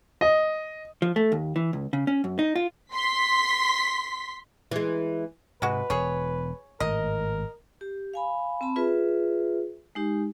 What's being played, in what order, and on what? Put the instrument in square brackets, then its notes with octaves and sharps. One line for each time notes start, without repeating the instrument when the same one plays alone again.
[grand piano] D#5
[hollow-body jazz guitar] F3
A3
D#2
E3
C#2
C#3
C#4
F#2
D#4
F4
[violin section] C6 B6
[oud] E3 G#3
[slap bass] G#2 C3 [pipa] G#3 F#4 [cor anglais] B4
[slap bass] E1 [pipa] G#4 C#5
[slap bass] G#1 A2 [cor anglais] A#4 [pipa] D#5
[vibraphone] G4
F5 G#5 B5
C4 A5 B5
F4 G#4 B4 E5
G#3 D#4 G4